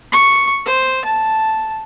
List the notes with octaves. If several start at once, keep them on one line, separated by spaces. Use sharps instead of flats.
C#6
C5
A5